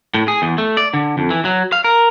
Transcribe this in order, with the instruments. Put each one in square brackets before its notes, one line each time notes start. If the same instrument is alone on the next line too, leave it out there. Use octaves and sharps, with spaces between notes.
[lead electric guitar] A2
G#4
E2
A3
D5
D3
F2
E3
F#3
F5
A#4